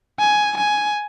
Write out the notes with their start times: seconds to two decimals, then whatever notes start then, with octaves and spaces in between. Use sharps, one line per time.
0.19 G#5
0.57 G#5